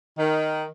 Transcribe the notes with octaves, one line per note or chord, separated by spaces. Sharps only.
D#3